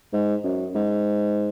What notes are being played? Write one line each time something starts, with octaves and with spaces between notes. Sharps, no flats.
G#2
F#2
G#2